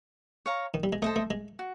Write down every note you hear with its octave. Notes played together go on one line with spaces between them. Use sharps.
C#5 F5 A#5
D#3
G3
G#3
A3 A4 C5 D#5
A3
G#3
F#4